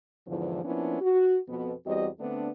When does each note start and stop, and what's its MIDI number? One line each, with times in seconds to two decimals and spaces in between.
0.27 0.63 40
0.27 0.63 44
0.27 0.63 50
0.27 0.63 52
0.27 0.63 53
0.64 0.97 53
0.64 0.97 58
0.64 0.97 59
0.64 0.97 61
0.64 0.97 62
0.64 0.97 64
1.01 1.38 66
1.49 1.72 41
1.49 1.72 47
1.49 1.72 59
1.86 2.08 40
1.86 2.08 55
1.86 2.08 60
1.86 2.08 66
1.86 2.08 67
1.86 2.08 75
2.20 2.50 50
2.20 2.50 57
2.20 2.50 59
2.20 2.50 60
2.20 2.50 62